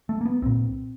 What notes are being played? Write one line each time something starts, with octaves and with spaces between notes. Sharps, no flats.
A3
A#3
B3
C2 A#2 C4